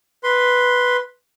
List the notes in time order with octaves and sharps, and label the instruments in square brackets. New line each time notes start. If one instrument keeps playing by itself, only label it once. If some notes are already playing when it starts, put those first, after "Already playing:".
[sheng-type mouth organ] B4 C6